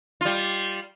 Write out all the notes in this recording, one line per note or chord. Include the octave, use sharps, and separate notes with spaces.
G3 F4